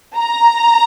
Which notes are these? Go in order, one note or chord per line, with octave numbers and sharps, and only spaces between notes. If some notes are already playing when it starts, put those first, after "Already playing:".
A#5